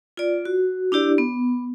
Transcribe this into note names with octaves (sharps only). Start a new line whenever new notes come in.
F4 D5
F#4
D4 E4 G4 D5
B3